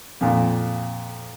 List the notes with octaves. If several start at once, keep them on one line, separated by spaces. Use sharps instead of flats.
F2 A#2